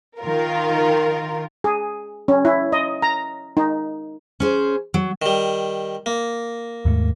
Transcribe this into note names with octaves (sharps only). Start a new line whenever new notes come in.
D#3 F4 A#4
G#4
C#4
E4
D#5
A#5
D#4
C#4 G#4 C5
F#3
D#3 G3
A#3
D#2 G#2 A3